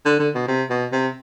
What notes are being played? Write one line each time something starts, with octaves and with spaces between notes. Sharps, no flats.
D3
D3
B2
C3
B2
C3